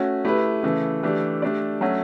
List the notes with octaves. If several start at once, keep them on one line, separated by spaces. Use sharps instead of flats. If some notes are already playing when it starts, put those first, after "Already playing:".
Already playing: A3 C#4 F#4
A3 E4 G4 B4
C#3 E3 A3
E3 A3 D4 G4
A3 D4 G4 D5
F#3 A3 C#4 F#4